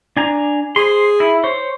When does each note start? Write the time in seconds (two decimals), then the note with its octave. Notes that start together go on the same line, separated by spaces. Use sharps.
0.17 D4 G#5 A#5
0.76 G#4 C5 C6
1.20 E4
1.44 C5 C#5